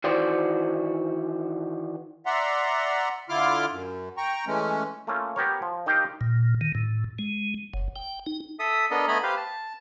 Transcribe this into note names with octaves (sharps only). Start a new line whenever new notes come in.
D#3 E3 F#4 C5 D5
D5 E5 F#5 A#5 C6
D3 E4 F4 C6 D6 F6
F#2
G5 A#5 C#6
E3 G#3 A3 C#4
A3 A#3 C#4 F4
B3 G4 A#4 C#5
F3
D#3 D#4 G4 D#5 F5 G5
A#2
D#3
A2
G#3
F#1
G5
D#4
A4 E5 D#6
B3 D4 A4 A#4 D#5
A3 B3 D#5 G#5 A#5 B5
G4 B4 C5 F5
A5